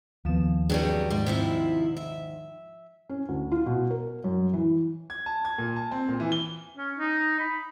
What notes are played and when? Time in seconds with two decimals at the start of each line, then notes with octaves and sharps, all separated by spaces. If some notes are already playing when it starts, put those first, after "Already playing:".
0.25 D#2 F3 B3 E7
0.70 G2 C3 F#3 G3 D4 G#4
1.10 G#2 D#3 G3 D5
1.26 C3 F3 E4
1.97 E5
3.09 C#4
3.29 D2
3.52 F4
3.66 B2
3.90 A#4
4.24 F#2
4.53 E3
5.10 G#6
5.26 A5
5.45 G#6
5.58 A#2
5.76 A5
5.91 C4
6.09 A#2
6.20 E3
6.32 G7
6.77 C#4
6.99 D#4
7.40 B5